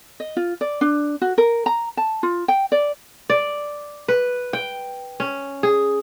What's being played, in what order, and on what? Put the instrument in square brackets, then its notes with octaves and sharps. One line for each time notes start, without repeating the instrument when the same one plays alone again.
[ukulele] D#5
F4
D5
D4
F#4
A#4
A#5
A5
F4
G5
D5
[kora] D5
B4
G5
C#4
G#4